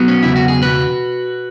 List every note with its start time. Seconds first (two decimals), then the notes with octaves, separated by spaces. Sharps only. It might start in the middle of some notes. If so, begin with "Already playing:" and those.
Already playing: F#3 B3
0.08 C#4
0.23 E2 C#3 E4
0.36 F#4
0.48 G#4
0.62 F#4 B4